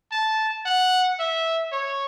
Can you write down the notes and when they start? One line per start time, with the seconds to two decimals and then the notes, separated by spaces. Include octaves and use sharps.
0.12 A5
0.66 F#5
1.19 E5
1.72 C#5